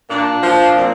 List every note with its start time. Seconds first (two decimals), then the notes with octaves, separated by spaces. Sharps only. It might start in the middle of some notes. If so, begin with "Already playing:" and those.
0.10 A#2 D4
0.43 F3
0.76 A#2 C4